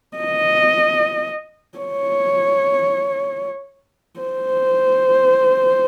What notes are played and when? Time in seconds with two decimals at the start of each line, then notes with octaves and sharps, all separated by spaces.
0.17 D#5
1.78 C#5
4.20 C5